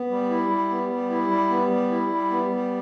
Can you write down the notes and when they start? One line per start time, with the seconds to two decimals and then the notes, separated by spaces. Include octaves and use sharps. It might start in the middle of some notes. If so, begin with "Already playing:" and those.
Already playing: B3
0.09 G3
0.30 E4
0.50 G3
0.70 B3
0.90 G3
1.10 E4
1.30 G3
1.50 B3
1.71 G3
1.91 E4
2.10 G3
2.30 B3
2.50 G3